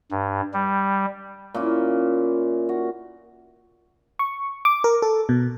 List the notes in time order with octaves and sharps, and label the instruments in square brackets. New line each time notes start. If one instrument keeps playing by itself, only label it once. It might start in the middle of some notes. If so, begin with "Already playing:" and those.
[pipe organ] G2
G3
[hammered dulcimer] A#2 C#4 E4
F#4
[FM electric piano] C#6
D6
A#4
A4
B2